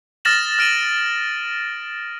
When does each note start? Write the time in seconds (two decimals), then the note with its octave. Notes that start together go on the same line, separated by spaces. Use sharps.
0.25 D#6 F6 A6 A#6 E7 F#7
0.59 F6 D7 D#7 F#7